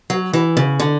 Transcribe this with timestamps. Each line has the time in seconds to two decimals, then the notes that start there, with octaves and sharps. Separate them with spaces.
0.10 F#3
0.33 E3
0.57 C#3
0.80 D3